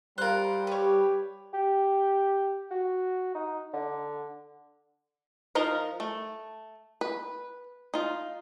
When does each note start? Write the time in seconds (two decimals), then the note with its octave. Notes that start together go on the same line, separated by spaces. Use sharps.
0.18 G3 F4 A#4 C5 F#6
0.67 G4 B4 C#5
1.54 G4
2.71 F#4
3.35 D#4
3.74 D3
5.55 F3 D#4 A#4 D#5 F5
6.00 A3
7.01 B4
7.94 D#4 F4